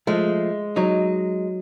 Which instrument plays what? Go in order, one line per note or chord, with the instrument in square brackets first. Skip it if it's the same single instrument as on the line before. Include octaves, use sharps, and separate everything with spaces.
[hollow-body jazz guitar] F3 A3 [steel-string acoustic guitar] G#3
[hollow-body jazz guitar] F#3 D#4